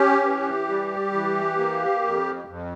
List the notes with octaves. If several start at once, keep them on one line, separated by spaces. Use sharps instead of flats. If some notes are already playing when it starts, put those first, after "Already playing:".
Already playing: C#4 G4
E3
G3
E3
A#3
F2
F2